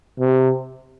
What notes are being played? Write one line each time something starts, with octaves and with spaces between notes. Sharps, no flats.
C3